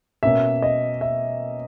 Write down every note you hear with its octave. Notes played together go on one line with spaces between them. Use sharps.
B2 A#3 C#4 E5
D#5
E5